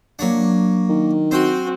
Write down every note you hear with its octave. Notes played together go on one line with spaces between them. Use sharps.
F#3 A#3 D4 C#5 F#5
D#3
C4 F#4 C5 G5 C6